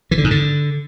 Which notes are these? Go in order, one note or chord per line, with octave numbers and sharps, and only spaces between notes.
E3
D3
G#2
D3